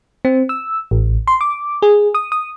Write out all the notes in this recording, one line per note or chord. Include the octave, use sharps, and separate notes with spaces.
C4
E6
A1
C6
D6
G#4
D#6
D#6